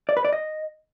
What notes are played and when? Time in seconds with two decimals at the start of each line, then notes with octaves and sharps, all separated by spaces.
0.09 D5
0.17 B4
0.25 D5
0.33 D#5